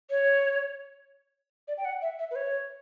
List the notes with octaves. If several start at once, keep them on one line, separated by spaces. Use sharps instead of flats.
C#5
D5
G5
F#5
E5
E5
B4
C#5